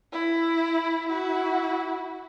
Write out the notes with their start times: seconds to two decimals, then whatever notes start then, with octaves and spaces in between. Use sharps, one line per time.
0.12 E4
1.08 E4 F#4